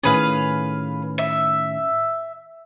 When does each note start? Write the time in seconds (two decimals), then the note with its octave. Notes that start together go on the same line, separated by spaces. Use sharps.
0.03 A2 D#3 C#4 G#4 B4 F5
1.18 E5